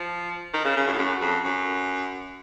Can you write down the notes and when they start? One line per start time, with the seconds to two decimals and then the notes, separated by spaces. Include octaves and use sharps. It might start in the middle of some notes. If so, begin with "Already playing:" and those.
Already playing: F3
0.54 D#3
0.65 C#3
0.76 C#3
0.87 F#2
0.93 A2
0.98 F#2
1.21 F2
1.45 F#2